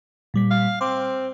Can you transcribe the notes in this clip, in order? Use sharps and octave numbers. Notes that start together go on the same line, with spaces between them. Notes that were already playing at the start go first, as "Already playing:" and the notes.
A#2 G3 B6
F5
C4 C6 D6